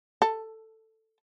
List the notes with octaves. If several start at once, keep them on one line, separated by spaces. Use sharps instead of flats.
A4